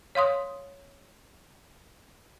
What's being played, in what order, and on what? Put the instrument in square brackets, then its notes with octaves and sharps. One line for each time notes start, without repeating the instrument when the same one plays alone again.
[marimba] C#5 F5 C6 D#6